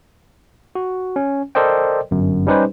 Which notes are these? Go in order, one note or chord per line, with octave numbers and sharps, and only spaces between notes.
F#4
C#4
A4 A#4 C5 D5 D#5 G5
G1 F#2
G3 C#4 D#4 G4 B4 C5